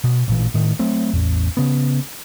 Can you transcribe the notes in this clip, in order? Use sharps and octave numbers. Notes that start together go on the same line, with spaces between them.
B2
A1 A#2 E3
A2 D#3
F#3 A3 C4
A1 E2
C#3 B3